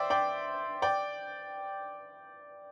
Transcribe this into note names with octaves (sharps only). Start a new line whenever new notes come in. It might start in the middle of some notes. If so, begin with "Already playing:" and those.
Already playing: C5 D5 E5 G5
D5 G5
D5 G5